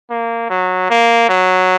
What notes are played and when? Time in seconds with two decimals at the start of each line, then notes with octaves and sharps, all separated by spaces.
0.10 A#3
0.50 F#3
0.90 A#3
1.29 F#3